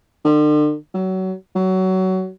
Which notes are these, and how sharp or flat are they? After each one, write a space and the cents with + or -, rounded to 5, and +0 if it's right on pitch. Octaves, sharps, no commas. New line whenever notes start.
D3 +40
F#3 +25
F#3 +20